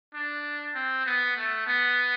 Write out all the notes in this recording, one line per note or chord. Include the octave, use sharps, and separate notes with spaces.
D4
C4
B3
A3
B3